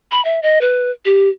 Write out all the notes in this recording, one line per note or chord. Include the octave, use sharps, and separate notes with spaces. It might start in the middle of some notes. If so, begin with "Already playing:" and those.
B5
E5
D#5
B4
G4